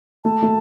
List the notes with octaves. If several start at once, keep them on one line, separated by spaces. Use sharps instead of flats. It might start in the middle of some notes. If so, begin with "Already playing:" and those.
A3 A5
A3